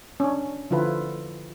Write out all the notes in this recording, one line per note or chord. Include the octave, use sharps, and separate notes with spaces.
C#4 D4
D3 F3 E4 F4 B4